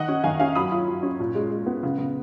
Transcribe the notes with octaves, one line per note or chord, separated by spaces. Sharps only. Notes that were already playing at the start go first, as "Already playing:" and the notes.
Already playing: D#3 D#5 F#5
C#4
D#3 F5 G#5
C#4 F5 G#5
F#3 B5 D#6
F4
F#3
C#4
A#2
G#3
G#3
B3
C#3
C#3